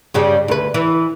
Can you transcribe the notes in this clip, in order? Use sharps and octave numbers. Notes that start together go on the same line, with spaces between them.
G2 C#3 G3
D2 B4
E3